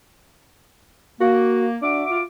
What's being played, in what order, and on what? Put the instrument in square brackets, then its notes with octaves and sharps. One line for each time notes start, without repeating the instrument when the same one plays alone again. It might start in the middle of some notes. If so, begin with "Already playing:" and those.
[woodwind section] A#3 [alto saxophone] F#4
[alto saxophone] D4 [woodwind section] F#4 E5 D6
[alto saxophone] F4